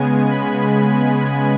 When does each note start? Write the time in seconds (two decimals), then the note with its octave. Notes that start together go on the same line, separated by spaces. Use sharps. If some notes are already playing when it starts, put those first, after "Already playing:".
Already playing: C#3 G#3 B3 G#5
0.31 B5